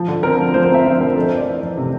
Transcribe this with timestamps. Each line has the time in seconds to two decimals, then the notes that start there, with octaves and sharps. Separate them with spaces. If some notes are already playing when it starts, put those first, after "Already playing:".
Already playing: F3
0.08 D3
0.23 C4 A#4
0.39 F3
0.54 F3 C5
0.64 C5
0.70 C4 E5
0.85 F3 C5
1.00 D3 A#4
1.16 F2 A4
1.26 C5
1.32 F2
1.37 D5
1.47 E3
1.62 F2
1.78 C3